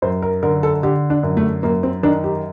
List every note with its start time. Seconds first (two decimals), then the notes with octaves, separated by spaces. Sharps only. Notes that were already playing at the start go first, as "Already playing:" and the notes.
0.02 F#2 C5
0.22 A#4
0.43 D3 A#4
0.63 A4
0.83 D3 G4
1.10 D4
1.23 F#2
1.37 A3
1.63 F#2 A#3
1.83 C4
2.03 D#3 D4
2.24 G4